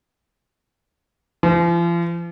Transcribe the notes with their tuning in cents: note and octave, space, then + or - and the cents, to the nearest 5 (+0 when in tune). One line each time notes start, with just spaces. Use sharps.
F3 -40